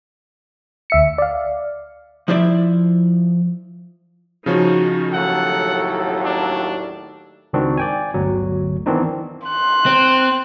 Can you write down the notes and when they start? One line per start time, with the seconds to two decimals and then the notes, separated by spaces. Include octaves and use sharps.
0.90 D2 E5 C#7
1.18 D5 F5
2.28 F3 E4 C5 D5 E5
4.46 C#3 F3 C#4 D#4 F#4
5.13 D#2 A2 F#3 A4 F#5
6.24 D4
7.53 C#2 D#3 C4 D4 F#4
7.77 D5 G5 G#5
8.14 G1 D2 F#3
8.86 D#3 E3 B3 C4 D4 D#4
9.47 C6 F#6
9.86 C4